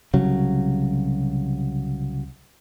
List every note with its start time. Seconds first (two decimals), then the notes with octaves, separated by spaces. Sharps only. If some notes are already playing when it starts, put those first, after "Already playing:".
0.14 C2 C#3 F#3